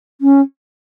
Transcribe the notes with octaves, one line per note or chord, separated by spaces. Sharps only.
C#4